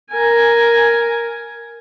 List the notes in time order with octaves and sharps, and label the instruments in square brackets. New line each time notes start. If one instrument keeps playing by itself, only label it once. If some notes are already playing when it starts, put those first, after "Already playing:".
[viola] A#4 G#5